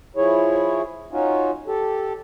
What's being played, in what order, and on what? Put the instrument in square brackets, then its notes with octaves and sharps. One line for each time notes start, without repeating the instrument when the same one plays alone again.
[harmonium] F3 E4 G#4 C#5
C#4 D#4 F4 F#4
G4 A4